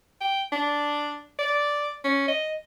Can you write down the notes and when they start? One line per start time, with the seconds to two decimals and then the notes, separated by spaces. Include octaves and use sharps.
0.21 G5
0.52 D4
1.39 D5
2.04 C#4
2.28 D#5